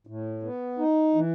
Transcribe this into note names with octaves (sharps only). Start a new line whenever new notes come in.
A2
B3
D#4
E3